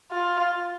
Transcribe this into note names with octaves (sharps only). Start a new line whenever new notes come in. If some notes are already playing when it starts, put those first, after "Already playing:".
F4